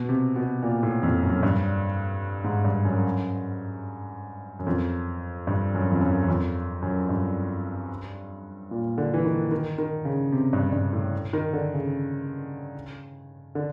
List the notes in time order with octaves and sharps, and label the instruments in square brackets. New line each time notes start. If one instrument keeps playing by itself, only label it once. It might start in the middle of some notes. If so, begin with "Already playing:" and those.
Already playing: [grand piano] B2
C3
B2
A#2
A2
F2
F#2
G2
G#2
G2
F#2
F#2
F2
G2
F#2
F2
F#2
F#2
F2
F#2
G2
A#2
D3
E3
D#3
D#3
D#3
C#3
C3
G2
G2
A2
D#3
D3
C#3
D3